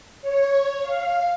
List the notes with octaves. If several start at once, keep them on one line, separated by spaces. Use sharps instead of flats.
C#5
F5